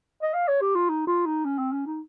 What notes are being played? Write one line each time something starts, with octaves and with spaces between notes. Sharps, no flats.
D#5
F5
C#5
G4
F4
D#4
F4
D#4
C#4
C4
C#4
D#4